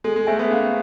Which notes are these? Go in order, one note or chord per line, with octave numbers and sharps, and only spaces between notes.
G#3 A4
G#3
A3 C5 E5 G#5
B3
A#3 C#4